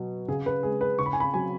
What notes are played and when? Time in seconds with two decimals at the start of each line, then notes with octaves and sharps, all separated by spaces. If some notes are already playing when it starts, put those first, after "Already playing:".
Already playing: B2 F#3
0.28 C#3 G#4
0.46 B4
0.63 G#3 G#4
0.81 B4
0.99 C#3 C#6
1.06 B5
1.13 G#5
1.20 B5
1.34 F#3 G#5